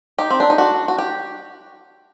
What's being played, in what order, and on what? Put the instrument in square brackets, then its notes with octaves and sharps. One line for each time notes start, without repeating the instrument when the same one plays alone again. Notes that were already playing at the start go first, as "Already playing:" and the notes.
[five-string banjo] D#4 G4
C4
D4
D#4
D4 F#4
F#4
G4